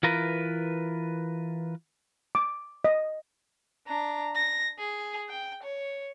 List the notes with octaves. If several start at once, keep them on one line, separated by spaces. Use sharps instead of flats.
E3 F4 A#4 B4
D6
D#5
D4 A#5
A#6
G#4
G5
C#5